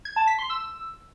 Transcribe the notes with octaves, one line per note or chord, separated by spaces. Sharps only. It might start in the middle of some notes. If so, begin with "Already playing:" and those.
G#6
A5
B6
C6
E6